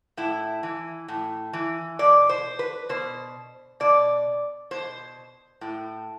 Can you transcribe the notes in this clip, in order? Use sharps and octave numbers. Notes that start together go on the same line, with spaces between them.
A2 E4
E3
A2
E3
B2 D5
C5
B4
B2 C5
B2 D5
B2 C5
A2